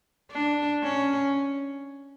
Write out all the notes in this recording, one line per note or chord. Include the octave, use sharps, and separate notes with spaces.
D4
C#4